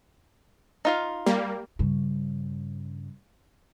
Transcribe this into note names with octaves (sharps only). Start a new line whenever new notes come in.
D#4 F4 F5
G3 A#3
G2 C#3